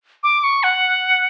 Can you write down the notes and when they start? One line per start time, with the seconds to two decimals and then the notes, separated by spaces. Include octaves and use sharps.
0.23 D6
0.44 C#6
0.63 F#5